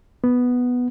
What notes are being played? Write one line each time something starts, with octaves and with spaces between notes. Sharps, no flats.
B3